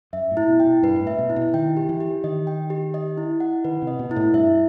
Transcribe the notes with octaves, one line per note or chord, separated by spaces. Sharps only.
F#2 E5
A2
E4
B2
G5
B2
G2 B4
A2
E5
B2
E4
B2
D#3 G5
G4
E3
G4
D#3 D#5
G5
G4
D#5
E4
F#5
D#3 B4
C3
D#5
B2
B2 E4
A2
G2 E5